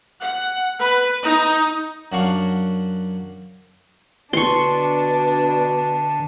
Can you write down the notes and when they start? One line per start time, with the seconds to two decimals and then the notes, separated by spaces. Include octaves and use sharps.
0.21 F#5
0.80 B4
1.24 D#4
2.12 F#2 F#3 D4 F#4 F5 C#6
4.33 B2 D3 D4 A5 C6 C#6